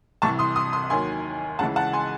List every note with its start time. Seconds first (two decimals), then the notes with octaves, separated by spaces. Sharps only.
0.22 C2 C3 E3 A5 C#6
0.39 C6 D#6
0.56 C6 D#6
0.73 C6 D#6
0.90 D#2 D#3 F#3 G#5 C6
1.59 C#2 C#3 E3 F#5 A5
1.76 F#5 A5
1.93 G#5 C6